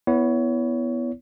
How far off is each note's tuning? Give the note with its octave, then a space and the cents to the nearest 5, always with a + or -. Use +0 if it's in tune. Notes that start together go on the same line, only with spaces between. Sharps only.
B3 +0 E4 +0 C#5 +25